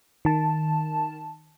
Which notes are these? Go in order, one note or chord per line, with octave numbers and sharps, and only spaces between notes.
D#3 A5